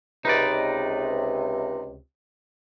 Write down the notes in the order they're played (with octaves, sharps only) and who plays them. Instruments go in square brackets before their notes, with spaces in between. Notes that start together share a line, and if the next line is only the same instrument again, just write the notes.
[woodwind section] C#2 C3 [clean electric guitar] D#4 B4 D5